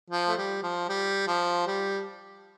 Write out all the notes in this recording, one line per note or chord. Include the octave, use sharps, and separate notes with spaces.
F3
A3
G3
F3
G3
F3
G3